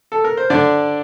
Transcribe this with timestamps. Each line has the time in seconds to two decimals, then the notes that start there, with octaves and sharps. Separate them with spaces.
0.12 A4
0.24 A#4
0.37 C5
0.50 D3 D4 D5